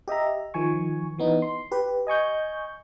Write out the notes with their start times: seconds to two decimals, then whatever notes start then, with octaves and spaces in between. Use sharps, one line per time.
0.08 G4 D#5 E5 A#5
0.54 D#3 F3 G#5 C#6
1.18 E3 B3 D#4
1.42 C6
1.72 G4 B4
2.07 D#5 G#5 C#6 G6